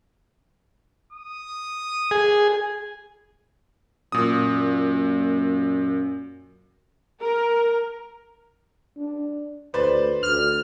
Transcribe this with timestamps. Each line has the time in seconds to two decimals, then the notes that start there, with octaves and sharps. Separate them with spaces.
1.13 D#6
2.11 G#4
4.12 F#2 A#2 D#6
7.22 A#4
8.97 D4
9.74 D2 B4 C5 D5
10.23 D2 F6